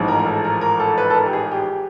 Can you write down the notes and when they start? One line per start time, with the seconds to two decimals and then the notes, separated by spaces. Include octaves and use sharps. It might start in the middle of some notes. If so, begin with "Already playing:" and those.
Already playing: A1 G#2 F3
0.08 A#4
0.19 A#4
0.26 A4
0.44 A#4
0.61 A#4
0.80 A4
0.98 B4
1.10 A4
1.15 A#4
1.26 G4
1.33 G#4
1.51 G4